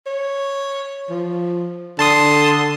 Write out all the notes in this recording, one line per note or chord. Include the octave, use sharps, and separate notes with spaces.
C#5
F3
D3 A5 C6 D#6